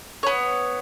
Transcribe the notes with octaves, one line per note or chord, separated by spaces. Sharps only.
B3 C#5